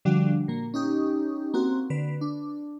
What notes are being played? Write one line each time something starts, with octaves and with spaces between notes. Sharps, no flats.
D3 F3 G3 D4 F#4
A#2 A#3
C#4 D#4 G4
A#3 C4 F#4
D3 B4
D4